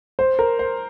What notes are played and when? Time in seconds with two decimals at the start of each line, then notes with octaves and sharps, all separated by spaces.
0.19 C5
0.39 A#4
0.59 C5